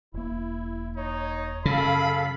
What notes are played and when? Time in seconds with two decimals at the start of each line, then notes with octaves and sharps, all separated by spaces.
0.14 E1 A#3 E4
0.97 D#4 C#5
1.65 F#2 C#3 A4 F5 B5